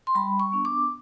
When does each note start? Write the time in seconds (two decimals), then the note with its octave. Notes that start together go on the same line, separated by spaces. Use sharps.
0.07 C6
0.15 G3 B5
0.40 C#6
0.52 B3 D4
0.65 D6